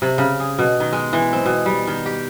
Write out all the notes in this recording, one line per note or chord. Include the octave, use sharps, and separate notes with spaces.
C3
C#3
G#4
B2
D#3
G#3
E3
C4
B2
G3
D#3
G4